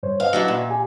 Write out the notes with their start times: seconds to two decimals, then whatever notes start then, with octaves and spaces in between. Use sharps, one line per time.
0.03 G2 C5 C#5
0.20 B4 D#5 F5 F#5
0.33 F#3 D4 E4
0.48 A#2
0.70 G4 G#5